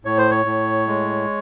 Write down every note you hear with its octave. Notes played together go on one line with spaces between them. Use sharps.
A2 C#5
C5
C#5
A2
G#3